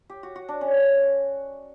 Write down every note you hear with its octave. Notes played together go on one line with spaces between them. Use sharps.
G4
F#4
F#4
D4
C#4